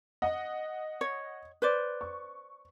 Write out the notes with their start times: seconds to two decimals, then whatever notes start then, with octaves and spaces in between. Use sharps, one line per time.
0.22 D#5 F#5
1.01 C#5
1.62 B4 C5 D5
2.01 C#6